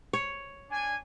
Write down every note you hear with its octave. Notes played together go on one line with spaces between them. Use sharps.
C#5
D4 G#5